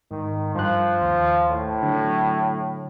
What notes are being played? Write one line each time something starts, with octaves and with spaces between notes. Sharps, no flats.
G#2 D#3
G2 F3 F#6
D#2
A2
D3 F#3